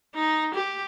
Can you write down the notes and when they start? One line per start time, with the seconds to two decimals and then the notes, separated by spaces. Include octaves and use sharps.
0.15 D#4
0.54 G4